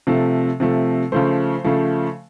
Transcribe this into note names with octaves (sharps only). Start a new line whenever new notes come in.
C3 F3 A3
C3 F3 A3
C#3 F3 A3 C5
C#3 F3 A3